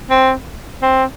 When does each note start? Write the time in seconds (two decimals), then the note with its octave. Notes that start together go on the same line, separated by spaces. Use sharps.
0.10 C4
0.82 C4